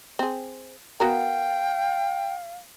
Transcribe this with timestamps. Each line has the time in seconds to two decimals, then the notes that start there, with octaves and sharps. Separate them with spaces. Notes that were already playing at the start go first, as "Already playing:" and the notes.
0.19 C4 G#4
1.00 B3 F#4 A#4 F5 G5